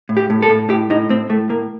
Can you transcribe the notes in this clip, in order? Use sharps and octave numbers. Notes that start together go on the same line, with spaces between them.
A2
G4
A2
A4
A2
A2 G4
A2 D#4
A2 C4
A2 A3
A2 A#3